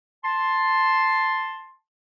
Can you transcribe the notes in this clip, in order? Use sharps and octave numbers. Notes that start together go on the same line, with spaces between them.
A5 C6